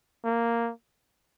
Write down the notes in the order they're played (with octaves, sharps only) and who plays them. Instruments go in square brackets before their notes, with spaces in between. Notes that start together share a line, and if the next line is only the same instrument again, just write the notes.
[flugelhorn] A#3